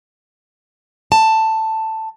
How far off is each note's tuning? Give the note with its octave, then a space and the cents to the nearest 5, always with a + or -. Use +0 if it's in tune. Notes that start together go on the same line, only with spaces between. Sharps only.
A5 +10